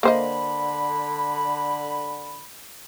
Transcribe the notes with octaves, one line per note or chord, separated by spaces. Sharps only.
D3 A#3 C5 D#5 B5